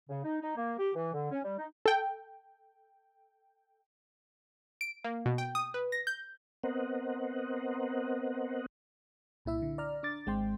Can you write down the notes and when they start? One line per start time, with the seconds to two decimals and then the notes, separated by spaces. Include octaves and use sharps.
0.09 C#3
0.24 D#4
0.42 D#4
0.56 A#3
0.79 G4
0.95 E3
1.14 D3
1.31 C#4
1.43 G3
1.58 D#4
1.86 A4 G5
4.81 D7
5.04 A#3
5.26 B2
5.38 G5
5.55 D#6
5.74 B4
5.92 A#6
6.07 G6
6.63 B3 C4 A#4 C5 D#5 F#5
9.45 C2 A#2 E4 E5
9.62 D3
9.78 D5 A#5 F6
10.03 D4 D6 A6
10.26 G#1 G#3 C4 G5 C6